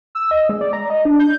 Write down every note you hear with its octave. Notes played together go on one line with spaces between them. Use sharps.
E6
D#5
G#3
D5
A#5
D#5
D4
G6